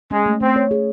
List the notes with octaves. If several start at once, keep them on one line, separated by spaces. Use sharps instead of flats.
G#3 C#4
A3
A3 C4
C#5
G#4